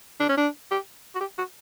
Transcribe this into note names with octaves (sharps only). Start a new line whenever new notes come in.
D4
C#4
D4
G4
F#4
G4
F#4